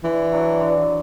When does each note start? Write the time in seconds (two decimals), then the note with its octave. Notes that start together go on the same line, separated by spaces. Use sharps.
0.04 D3 E3
0.32 F#3 D4 F#4
0.60 D3